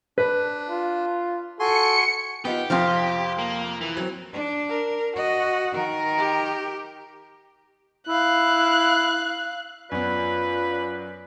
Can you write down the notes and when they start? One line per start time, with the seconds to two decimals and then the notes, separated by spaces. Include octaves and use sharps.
0.18 D4 B4
0.70 F4
1.60 F#4 A4 G#5 C6 C#7
2.45 B3 D#4 F4 G4
2.70 F2 C3 F3 C4 F4
3.39 A#3
3.81 E3
3.97 F#3 C4
4.33 D4
4.69 A#4
5.16 F#4 D#5
5.72 D#3 A#4
6.17 G4
8.08 E4 F5 F#6
9.91 F#2 B3 F4 B4 D5